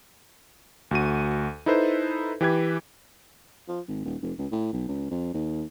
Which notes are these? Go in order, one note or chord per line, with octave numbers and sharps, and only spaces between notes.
D2 F#4 D#7
D#4 E4 A4 B4 C5
E3 G4 B4 G#6
F3
G#1
D#1
F1
C#2
A2
B1
C#2
F2
D#2